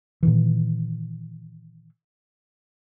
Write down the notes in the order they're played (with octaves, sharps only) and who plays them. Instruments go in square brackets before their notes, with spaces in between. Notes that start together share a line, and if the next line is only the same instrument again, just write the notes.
[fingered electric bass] A#2 D#3 E3